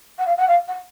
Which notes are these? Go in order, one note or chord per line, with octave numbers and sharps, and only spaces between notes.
F#5
F5
F#5
F5
F#5